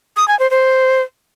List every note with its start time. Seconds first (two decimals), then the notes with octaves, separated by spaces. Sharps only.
0.17 D#6
0.28 G#5
0.39 C5
0.51 C5